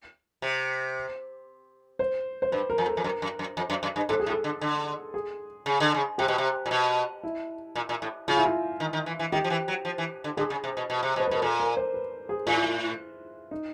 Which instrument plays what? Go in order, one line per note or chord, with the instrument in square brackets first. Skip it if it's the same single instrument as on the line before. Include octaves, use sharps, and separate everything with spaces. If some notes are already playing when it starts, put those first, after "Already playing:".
[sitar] C3
[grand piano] C5
C5
[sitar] G2 [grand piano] B4
[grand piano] A#4
[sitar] F2
[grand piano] A4
[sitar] F2
[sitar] F#2 [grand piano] A#4
[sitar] F#2
F#2
F2
F#2
F#2
G2
[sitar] G#2 [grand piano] A4
[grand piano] G#4
[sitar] A2
[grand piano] A4
[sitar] D3
D3
[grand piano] G#4
[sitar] C#3
D3
C#3
[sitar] C3 [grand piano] G4
[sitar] B2
C3
A#2
B2
[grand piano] E4
[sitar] A#2
A#2
A2
[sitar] C#3 [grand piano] F4
[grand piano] E4
F4
[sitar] D#3
D#3
E3
E3
[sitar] D#3 [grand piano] G4
[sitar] F3
E3
F#3
F3
E3
D3
[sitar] D3 [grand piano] G#4
[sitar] C#3
C3
B2
B2
C3
B2
[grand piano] C5
B4
[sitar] B2 [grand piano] A#4
[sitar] A#2 [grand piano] A4
[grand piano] A#4
C5
B4
G#4
[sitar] A2 [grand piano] F4
[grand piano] E4
F4
D#4